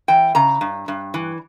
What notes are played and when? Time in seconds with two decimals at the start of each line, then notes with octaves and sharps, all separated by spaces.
0.08 E3 G5
0.35 C#3 A#5
0.61 G2
0.88 G2
1.14 E3